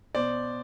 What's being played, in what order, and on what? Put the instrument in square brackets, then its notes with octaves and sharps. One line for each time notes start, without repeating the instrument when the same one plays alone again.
[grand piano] B2 C5 D5